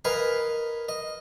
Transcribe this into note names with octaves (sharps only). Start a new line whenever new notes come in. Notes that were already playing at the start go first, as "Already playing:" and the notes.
A#4 B4 D#5 F5 G#5 A#5
D#5